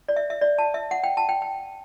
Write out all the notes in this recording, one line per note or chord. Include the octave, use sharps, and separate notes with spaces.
D5
E5
E5
D5
A5
E5
F#5
G5
A5
G5
G5